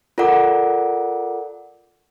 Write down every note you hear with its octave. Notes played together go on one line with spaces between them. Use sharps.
F4 A4 A#4 D5 F#5 D6